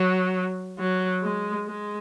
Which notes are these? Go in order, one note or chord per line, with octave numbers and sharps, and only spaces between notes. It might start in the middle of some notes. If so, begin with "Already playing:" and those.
Already playing: F#3
F#3
G#3
G#3